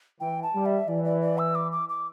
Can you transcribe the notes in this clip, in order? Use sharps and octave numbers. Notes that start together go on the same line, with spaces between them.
E3 G5
A5
G3
E5
E3 D5
D5
D5
E6
D6
D6
D6